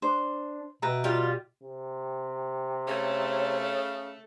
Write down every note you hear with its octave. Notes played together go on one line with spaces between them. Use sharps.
D4 C5
B2 B4 E5 G5 A#5
G3 F4
C3
C#3 A3 A4 C#5